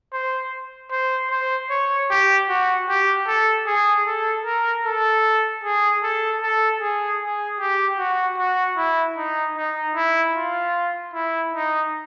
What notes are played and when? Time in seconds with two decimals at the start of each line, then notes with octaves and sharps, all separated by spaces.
0.13 C5
0.91 C5
1.30 C5
1.70 C#5
2.10 G4
2.49 F#4
2.89 G4
3.27 A4
3.66 G#4
4.07 A4
4.45 A#4
4.85 A4
5.63 G#4
6.03 A4
6.42 A4
6.81 G#4
7.21 G#4
7.60 G4
7.98 F#4
8.38 F#4
8.77 E4
9.17 D#4
9.57 D#4
9.95 E4
10.35 F4
11.14 E4
11.53 D#4